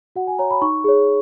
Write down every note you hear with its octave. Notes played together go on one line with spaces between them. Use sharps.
F#4 F#5
G#5
C#5 A#5
B5
D#4 C#6
G#4 C#5